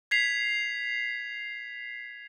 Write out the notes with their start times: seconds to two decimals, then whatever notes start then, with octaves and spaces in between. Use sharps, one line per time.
0.11 G#6 B6 C7 F7